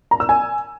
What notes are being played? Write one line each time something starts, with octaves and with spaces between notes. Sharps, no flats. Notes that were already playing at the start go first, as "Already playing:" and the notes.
A#5
E6
G#5